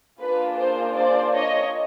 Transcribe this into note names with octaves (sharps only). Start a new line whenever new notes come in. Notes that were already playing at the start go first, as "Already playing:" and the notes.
A#3 D4 F4 G#4 B4
C5
C5 D5
C#5 D#5